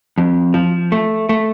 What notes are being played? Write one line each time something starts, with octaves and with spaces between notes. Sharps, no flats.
F2
F3
A3
A3